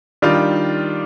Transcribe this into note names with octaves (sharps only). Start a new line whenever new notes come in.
D#3 G3 D4 F4